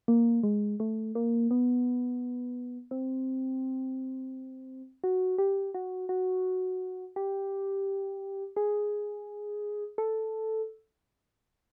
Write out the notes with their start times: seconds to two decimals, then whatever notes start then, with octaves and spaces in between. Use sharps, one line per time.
0.08 A#3
0.43 G#3
0.80 A3
1.15 A#3
1.51 B3
2.91 C4
5.04 F#4
5.38 G4
5.74 F#4
6.09 F#4
7.16 G4
8.56 G#4
9.98 A4